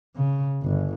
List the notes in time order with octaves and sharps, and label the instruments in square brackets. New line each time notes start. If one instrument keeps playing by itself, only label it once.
[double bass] C#3
G1